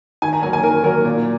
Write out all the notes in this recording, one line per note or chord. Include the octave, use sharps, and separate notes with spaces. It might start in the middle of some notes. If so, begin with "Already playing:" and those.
D#3 G#5
A#5
F#3 A#3 G#5
G#5
D#3 A#4
F#3 A#3 A#4
A#2